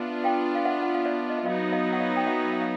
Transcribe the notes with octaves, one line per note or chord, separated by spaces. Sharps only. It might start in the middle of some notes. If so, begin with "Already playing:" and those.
Already playing: B3 D4 F4 E5 F#5
F5 G5
F5
E5 F#5
F#5
F5
D5 E5
D#5
E5
F#3 B3 D#4 D#5 F5
D#5 F5
F#5
D#5 F5
G5
E5 F#5
E5
F5